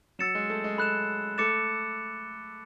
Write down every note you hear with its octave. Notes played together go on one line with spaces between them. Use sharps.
F#3 E6 A6 C#7 E7
G#3
A3
G#3
A3 B5 F#6 C#7 E7
A3 D6 A6 C#7 E7